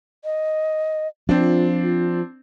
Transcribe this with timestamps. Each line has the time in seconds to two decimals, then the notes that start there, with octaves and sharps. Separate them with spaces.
0.24 D#5
1.29 F3 C4 D4 F4